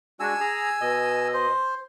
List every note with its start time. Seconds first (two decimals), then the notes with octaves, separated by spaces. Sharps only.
0.20 G#3 D4 F#4 G#5 E6
0.40 G#4 A#5
0.81 B2 D#5
1.34 C5